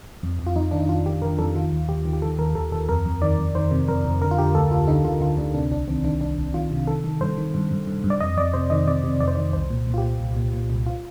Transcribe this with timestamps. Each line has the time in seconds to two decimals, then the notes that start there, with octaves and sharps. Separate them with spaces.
0.23 F2
0.39 F2
0.47 F4
0.56 F2 D#4
0.71 D#3 D4
0.80 D#4
0.89 F2 F4
1.06 D#3 G4
1.22 D#3 A#4
1.38 F2 A4
1.55 D#3 F4
1.72 D#2
1.88 D#2 G4
2.05 D#3
2.13 G4
2.22 D#3 A4
2.39 D#2 A#4
2.55 D#2 A4
2.72 D#2 A4
2.89 F2 A#4
3.05 F2
3.22 D#3 D5
3.38 F2
3.55 D#3 C5
3.71 C3
3.88 F2 A#4
4.05 F2
4.21 D3 A#4
4.31 F4
4.38 D3 G4
4.55 D2 A4
4.71 D2 F4
4.88 D3 D#4
5.05 D3 F4
5.21 D3 F4
5.37 D2 D4
5.54 C3 D4
5.71 C2 D4
5.87 D#3 C4
6.04 D#3 D4
6.21 C2 D4
6.38 C2
6.54 D#3 F4
6.71 C3
6.87 D#3 A4
7.04 D#3
7.21 G2 C5
7.37 D#3
7.54 G2
7.71 G2
7.87 G2
8.04 G2
8.10 D5
8.21 F2 D#5
8.37 F2 D5
8.54 C3 C5
8.70 D#3 D#5
8.87 C3 D5
9.03 C3
9.20 F2 D5
9.28 C5
9.35 D#3 D5
9.53 C2 C5
9.70 A#2
9.87 A#2
9.94 F4
9.98 G4
10.03 A#2
10.20 C2
10.37 A#2
10.53 A#2
10.70 C2
10.87 F4